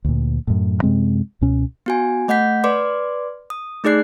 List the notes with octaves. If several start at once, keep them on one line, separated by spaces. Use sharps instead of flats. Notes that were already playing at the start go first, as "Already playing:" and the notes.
D2 A#2
F#2 A2
F#2 C3 G#3 C4
C#2 B2 C#4
B3 F#4 G#5
A3 D#5 F#5 G6 B6
B4 D5 C6 D6
D#6
A3 D#4 G#4 D5 F#6 C7